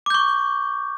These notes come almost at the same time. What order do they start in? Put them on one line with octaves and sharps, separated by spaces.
D6 G6 C#6